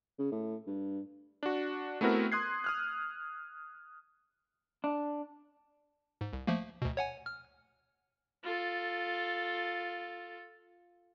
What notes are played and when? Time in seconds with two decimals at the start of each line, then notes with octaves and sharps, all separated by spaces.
0.19 C#3
0.32 A2
0.67 G2
1.43 D4 F#4
2.01 A3 B3 C4 E4 F#4 A#4
2.32 C6 D#6 F#6 G#6 C7
2.64 D#6 F6 F#6
4.84 D4
6.21 G#2
6.33 C2
6.47 F3 A3 A#3
6.82 D2 B2
6.97 C#5 F#5 G#5
7.26 F6
8.43 F4 A4